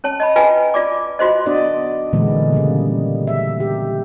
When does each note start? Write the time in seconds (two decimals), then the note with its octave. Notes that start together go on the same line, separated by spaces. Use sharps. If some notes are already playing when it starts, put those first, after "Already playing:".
0.04 C#4 C#5 A5
0.20 D#5 A5 B5
0.36 F4 B4 D#5 G5 G#5 A#5
0.74 F4 D5 D6
1.19 F4 F#4 C5 D#5
1.46 B3 D4 F#4 D5 D#5
2.13 A#2 D3 E3 G#3 A#3 B3
2.52 C#3 G3 A#3
3.27 E5
3.60 G4